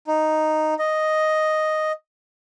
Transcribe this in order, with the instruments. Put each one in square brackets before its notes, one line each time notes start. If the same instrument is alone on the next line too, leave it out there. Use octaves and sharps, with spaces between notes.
[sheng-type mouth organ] D#4
D#5